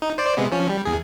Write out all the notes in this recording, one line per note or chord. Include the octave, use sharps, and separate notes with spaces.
D#4
C5 D5
C3 G#3 B3
F3 C#4
G3
E2 G#4